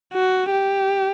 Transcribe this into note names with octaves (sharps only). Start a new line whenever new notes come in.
F#4
G4